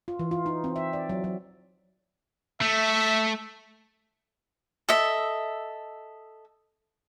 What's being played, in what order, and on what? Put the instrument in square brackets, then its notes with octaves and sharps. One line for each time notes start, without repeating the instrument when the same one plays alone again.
[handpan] F4
E3
F4
D#4
C4
E5
D5
F#3
F#3
[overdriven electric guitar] A3 [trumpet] E5
[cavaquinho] A4 D#5 E5